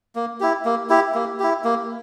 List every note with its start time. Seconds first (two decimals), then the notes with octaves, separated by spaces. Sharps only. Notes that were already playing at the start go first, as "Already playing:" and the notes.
0.16 A#3
0.40 E4 G4
0.65 A#3
0.90 E4 G4
1.15 A#3
1.40 E4 G4
1.64 A#3